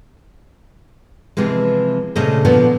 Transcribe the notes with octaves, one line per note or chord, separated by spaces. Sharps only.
C3 E3 F3 G#3
A#2 C#3 A3 G#4 C5 D#5
A#2 D3 F3 B3 F4